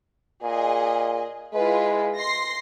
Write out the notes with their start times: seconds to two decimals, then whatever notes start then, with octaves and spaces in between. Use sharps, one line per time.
0.43 A#2 G#4 D#5
1.53 G#3 E4 F4 B4
2.17 C6 A#6 C7